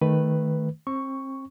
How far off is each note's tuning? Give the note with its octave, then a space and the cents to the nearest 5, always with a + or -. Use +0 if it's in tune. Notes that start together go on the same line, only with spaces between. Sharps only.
D#3 +0 A3 +0 B4 +0
C4 +35 C#6 +0